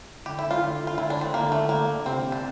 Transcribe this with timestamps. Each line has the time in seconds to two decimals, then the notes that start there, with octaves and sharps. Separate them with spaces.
0.26 D3 G4
0.39 E4
0.51 F4
0.62 D3
0.87 F4
0.98 D3 E4
1.10 D4
1.21 C4
1.34 D3 A#3
1.52 A3
1.69 A#3
2.06 C3 C4
2.32 D4